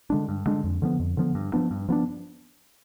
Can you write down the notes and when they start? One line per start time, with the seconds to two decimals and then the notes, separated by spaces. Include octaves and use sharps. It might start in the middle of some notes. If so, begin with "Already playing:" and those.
0.10 D3 G#3 D4
0.28 G2
0.46 D3 G#3 D4
0.64 F2
0.82 D3 F3 B3
0.99 F2
1.17 D3 F3 B3
1.35 G2
1.53 F3 B3 D4
1.71 G2
1.89 F3 B3 D4